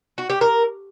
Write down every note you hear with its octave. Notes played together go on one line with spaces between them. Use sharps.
F#4
G4
A#4